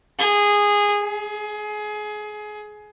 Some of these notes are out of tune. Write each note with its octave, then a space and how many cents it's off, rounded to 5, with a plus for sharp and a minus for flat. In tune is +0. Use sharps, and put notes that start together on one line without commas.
G#4 -15
G#4 +25